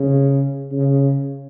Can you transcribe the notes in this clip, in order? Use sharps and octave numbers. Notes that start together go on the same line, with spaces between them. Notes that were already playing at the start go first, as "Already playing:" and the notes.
Already playing: C#3
C#3